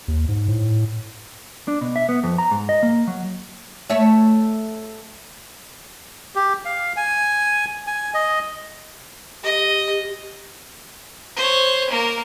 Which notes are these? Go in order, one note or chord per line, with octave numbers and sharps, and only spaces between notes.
D#2
G#2
A2
D4
B2
E5
B3
F2
A#5
G#2
D#5
A#3
F#3
A3 C#5 E5
G4
F5
G#5
G#5
D#5
G4 D#5
C5 C#5
A#3 A#4